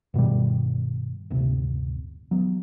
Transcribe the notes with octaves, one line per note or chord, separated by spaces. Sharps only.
G2 B2 D#3 G3
D1 G1 C3
F#3 B3